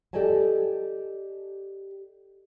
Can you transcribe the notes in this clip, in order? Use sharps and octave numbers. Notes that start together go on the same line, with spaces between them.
G4 A4 D5 D#5 G#5 A5